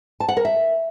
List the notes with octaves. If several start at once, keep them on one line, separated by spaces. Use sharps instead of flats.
A5
F#5
A#4
E5